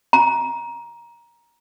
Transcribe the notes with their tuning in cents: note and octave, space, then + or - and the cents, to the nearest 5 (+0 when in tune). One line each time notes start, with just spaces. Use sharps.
A#5 +15